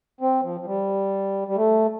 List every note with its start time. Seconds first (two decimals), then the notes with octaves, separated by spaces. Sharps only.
0.21 C4
0.44 F3
0.61 F3
0.66 G3
1.48 G3
1.56 A3